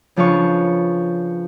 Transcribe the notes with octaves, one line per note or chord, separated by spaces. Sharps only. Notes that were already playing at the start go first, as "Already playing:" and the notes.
C#3 F3 D4 B4 F5 C#6